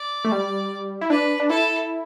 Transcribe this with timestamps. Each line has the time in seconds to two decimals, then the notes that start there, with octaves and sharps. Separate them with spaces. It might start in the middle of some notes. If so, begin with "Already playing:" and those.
Already playing: D5
0.25 A3
0.32 G3
1.01 E4
1.10 D4 B4
1.40 D4
1.49 E4 A4